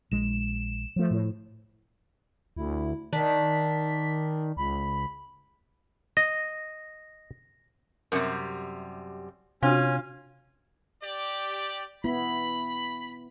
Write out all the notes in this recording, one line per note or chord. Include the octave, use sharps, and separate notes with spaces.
A#1 G#3 E7
F3 A3
A2
D2 E4
D#3 D4 B6
C#2 B5
D#5 A#6
F#2 C3 G3 A#4
C3 C#4 D4 F4 F#4 G#5
G4 D5
B3 E4 B5